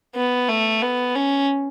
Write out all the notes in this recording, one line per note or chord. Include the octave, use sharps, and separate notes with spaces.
B3
A3
B3
C#4